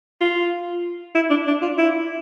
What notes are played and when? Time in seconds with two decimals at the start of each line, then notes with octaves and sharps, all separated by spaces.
0.21 F4
1.15 E4
1.30 D4
1.47 D4
1.62 F4
1.78 E4